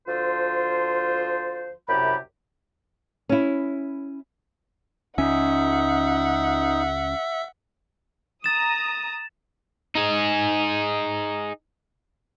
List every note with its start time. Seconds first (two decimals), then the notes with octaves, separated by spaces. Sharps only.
0.07 D2 F3 F4 C5
1.89 C2 F#2 C3 G4 B5
3.29 C#4 E4
5.18 C#2 C#4 D#4 E5 F#5
8.44 A#5 D#6 A6 E7
9.95 D#4 G#4